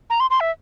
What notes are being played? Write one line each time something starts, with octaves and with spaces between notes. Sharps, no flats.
A#5
C6
C6
E5